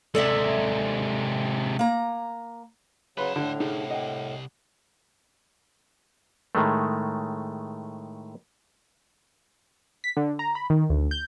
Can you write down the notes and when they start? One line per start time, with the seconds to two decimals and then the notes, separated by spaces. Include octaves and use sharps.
0.15 C3 G#3 A4 D5 E5
1.79 A#3 A#5
3.17 C#3 F#3 B4 C#5 C6
3.36 A2 D3
3.60 C2 D#4 G#4
3.91 D#5 F#5 G5
6.55 A2 D#3 G#3 A3
10.04 B6
10.17 D3
10.39 A#5
10.55 B5
10.70 D#3
10.90 D2
11.11 G6